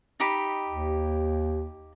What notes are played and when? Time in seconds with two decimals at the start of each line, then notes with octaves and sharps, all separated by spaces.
0.20 D#4 G4 B5
0.69 D#2